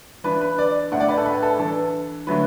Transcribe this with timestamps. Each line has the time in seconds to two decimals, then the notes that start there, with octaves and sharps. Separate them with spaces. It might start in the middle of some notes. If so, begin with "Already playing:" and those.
0.24 E3 D4 B4
0.41 B4
0.58 D5
0.92 A2 A3 D4 F#5
1.00 D5
1.09 B4
1.18 A4
1.26 B4
1.43 A4
1.59 E3 D4 A4
2.27 D3 F#3 A3 D4 B4